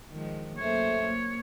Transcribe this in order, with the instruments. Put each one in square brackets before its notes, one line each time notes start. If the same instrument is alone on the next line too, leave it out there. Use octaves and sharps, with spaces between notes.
[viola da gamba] D#3 F3 G#3
[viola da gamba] F#2 A#3 C5 [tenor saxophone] A3 [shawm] C#5
[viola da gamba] A#3